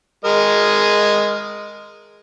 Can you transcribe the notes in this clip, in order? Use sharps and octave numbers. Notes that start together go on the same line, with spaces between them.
G#3 A#4 D#5